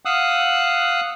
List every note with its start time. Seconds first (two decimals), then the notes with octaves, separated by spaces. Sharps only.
0.05 F5 F#5 D#6 E6 F#6